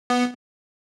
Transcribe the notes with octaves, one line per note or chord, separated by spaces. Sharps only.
B3